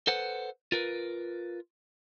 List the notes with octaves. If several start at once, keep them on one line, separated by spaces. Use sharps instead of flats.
A4 B4 C5 F#5
F4 A#4 B4